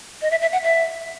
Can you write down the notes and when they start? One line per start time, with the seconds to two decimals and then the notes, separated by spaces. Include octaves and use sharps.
0.22 D#5
0.31 E5
0.41 E5
0.52 F#5
0.63 E5